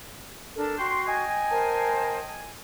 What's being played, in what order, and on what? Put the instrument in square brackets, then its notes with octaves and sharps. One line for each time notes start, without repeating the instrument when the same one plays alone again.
[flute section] D4 A4 A#4
[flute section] F#4 C#6 [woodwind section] G5 C6
[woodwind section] D#5 G5 G#5
[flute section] A#4 C5 A5